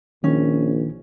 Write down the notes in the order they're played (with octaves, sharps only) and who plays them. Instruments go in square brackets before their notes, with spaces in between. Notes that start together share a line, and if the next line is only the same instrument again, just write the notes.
[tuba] A#1 [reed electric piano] D#3 [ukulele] C#4